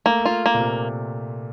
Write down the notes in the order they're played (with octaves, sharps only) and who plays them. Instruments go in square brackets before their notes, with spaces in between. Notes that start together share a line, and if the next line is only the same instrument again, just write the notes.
[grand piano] A3 [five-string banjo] A#3
[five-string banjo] F4
A#3
[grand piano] A#2
C3